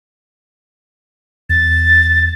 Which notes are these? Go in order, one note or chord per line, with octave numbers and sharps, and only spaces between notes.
E2 A6